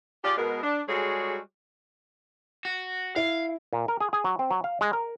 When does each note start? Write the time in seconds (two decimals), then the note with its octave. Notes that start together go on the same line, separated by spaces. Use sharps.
0.24 F4 G4 G#4 D5
0.37 B2 G#3 A#4
0.63 D4
0.88 G3 G#3 F#4 G#4 A4 C#5
2.65 F#4
3.16 E4 F5
3.73 A#2
3.88 A#4
4.01 G#4
4.13 G#4
4.24 F#3
4.39 C4
4.50 F#3
4.64 F5
4.81 G#3
4.93 A#4